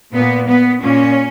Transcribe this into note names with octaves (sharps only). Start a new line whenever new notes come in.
A#2 B3
B3
A#2 C#4